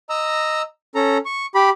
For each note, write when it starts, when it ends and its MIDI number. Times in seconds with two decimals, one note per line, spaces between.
0.09 0.62 75
0.09 0.62 82
0.09 0.62 88
0.95 1.18 61
0.95 1.18 69
0.95 1.18 82
1.25 1.46 85
1.55 1.70 67
1.55 1.70 83